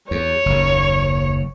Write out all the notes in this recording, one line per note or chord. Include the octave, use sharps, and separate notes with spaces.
E2 C#5
F#1 D#2